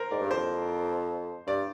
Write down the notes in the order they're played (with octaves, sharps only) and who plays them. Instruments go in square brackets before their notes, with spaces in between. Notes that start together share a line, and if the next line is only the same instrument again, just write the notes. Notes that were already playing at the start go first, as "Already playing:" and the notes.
Already playing: [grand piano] A#4 C5
[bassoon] G#2 [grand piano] D5
[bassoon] G2
[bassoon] F2 [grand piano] C5
[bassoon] G2 [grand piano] D5